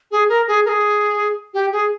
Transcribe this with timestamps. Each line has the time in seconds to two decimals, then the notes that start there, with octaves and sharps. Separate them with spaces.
0.11 G#4
0.29 A#4
0.48 G#4
0.65 A#4
0.69 G#4
1.54 G4
1.72 G#4